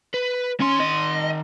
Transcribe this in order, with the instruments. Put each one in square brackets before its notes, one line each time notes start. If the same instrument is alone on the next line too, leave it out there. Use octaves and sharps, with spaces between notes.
[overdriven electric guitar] B4
[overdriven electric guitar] D#3 C6 [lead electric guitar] C#4
[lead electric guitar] D#5